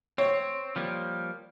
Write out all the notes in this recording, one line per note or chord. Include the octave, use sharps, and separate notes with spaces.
C4 C#5
F3 G3 A#3